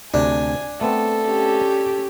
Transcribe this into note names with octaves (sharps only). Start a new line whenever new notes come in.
D2 C3 D4 G#5
A3 B3 C4 A4
C#4 G4